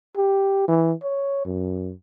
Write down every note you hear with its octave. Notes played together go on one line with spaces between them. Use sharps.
G4
E3
C#5
F#2